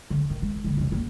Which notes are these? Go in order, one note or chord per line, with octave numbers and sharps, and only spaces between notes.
D3
D#3
G#3
D2 D3
E2 C3
A#3